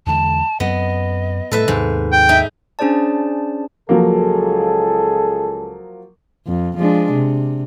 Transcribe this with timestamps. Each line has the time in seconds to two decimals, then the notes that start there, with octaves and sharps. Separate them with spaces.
0.06 E2 D3 G#3 A5
0.60 F#2 B3 C4 D#5
1.51 A2 G3 A4 B4 E5
1.68 D#2 G#2 C3
2.12 G5
2.29 D#4 E5
2.79 C#4 D4 G#4 C5 D5 A5
3.89 C#2 F3 F#3 A#3 G#4 A4
6.47 F2
6.77 F3 G#3 D4
7.12 C3